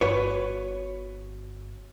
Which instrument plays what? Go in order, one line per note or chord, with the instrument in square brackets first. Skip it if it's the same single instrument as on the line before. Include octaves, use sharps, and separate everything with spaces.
[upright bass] G1 [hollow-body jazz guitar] F#4 B4 C#5